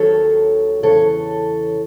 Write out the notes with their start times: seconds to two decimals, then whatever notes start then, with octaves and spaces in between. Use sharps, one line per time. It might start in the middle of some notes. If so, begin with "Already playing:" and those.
Already playing: D#2 D#3 F#3 A4 C#5
0.83 E2 C#3 E3 A4 C#5